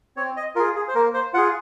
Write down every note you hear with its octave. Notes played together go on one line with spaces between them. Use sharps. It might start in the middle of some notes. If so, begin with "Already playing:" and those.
C4 C#5
D#5
F4 G#4 A#4
G#4
C5
A#3 A#4
C5
F4 G#4 F#5